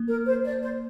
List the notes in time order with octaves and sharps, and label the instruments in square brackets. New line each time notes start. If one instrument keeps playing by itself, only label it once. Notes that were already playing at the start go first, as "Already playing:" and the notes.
Already playing: [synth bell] A#3
[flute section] A#4
C5
D5
C5